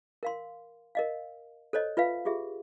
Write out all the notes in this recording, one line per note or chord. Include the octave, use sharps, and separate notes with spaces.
A#4 F5 C6
A#4 D#5 F5
A4 C5 C#5 D#5
F4 B4 E5 F5
F4 G4 G#4 E5